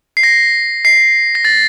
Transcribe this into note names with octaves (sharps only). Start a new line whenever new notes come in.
C7
A#6
C7
A#6
A6